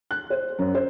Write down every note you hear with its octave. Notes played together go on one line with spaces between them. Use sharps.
F#6
C5
F#2
C5